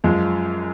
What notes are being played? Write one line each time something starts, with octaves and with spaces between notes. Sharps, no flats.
F#2 F3 G#3